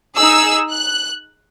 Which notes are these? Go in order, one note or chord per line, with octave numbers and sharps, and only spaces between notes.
D#4 G#4 E6
F#6